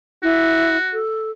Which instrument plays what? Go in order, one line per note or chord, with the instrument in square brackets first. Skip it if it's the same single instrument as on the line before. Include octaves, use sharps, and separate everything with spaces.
[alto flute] E4 [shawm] F#4
[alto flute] A4